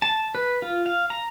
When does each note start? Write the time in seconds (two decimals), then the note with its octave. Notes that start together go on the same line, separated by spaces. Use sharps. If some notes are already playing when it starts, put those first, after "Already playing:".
0.02 A5
0.35 B4
0.62 F4
0.86 F5
1.10 A#5